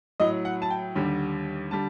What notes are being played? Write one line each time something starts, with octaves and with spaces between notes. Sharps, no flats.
A2 F#3 D#5
F#5
A5
G5
D#2 D3 G3
D3 G3 A5